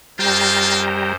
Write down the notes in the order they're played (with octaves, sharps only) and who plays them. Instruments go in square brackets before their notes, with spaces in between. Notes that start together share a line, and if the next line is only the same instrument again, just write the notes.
[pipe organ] F#2 C5 [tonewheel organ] G3 G5 A#5 [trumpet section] C4 F4